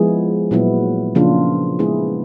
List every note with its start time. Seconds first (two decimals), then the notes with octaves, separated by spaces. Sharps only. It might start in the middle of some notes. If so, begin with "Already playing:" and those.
Already playing: F3 G#3 B3 E4 G#4
0.51 A#2 F#3 B3 E4
1.15 C#3 F3 A#3 D4 F4
1.79 G#3 B3 E4 G#4 B4